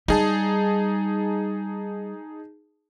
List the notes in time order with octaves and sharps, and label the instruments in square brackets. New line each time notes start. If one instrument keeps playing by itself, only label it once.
[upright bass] G3 [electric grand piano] D#4 G#4 A5